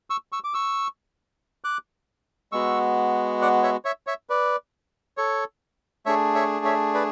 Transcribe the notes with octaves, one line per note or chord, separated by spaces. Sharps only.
C#6 E6
C#6 E6
D6
C#6 E6
D6 F#6
G#3 B3 F#4 C#6 E6
D5 F#5
C#5 E5
C#5 E5
C#5 E5
B4 D5
A4 C#5
A3 D4 G#4 C#5 E5
C#5 E5
C#5 E5
B4 D5